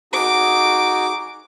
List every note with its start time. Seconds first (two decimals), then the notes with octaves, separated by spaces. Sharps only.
0.13 D#4 F#4 G#4 D6